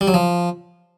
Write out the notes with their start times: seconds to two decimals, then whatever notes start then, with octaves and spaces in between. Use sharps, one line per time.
0.01 G3
0.08 F#3
0.14 F3